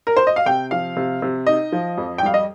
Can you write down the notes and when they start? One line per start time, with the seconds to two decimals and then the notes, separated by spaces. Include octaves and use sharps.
0.07 A#4
0.17 C5
0.27 D#5
0.36 F5
0.46 C3 G5
0.71 F3 F5
0.97 C3
1.22 C3
1.47 D#4 D#5
1.72 F3
1.98 F2
2.18 G5
2.23 G3 F5
2.34 D#5